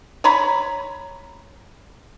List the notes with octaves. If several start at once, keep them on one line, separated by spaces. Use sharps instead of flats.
C#5 A#5 B5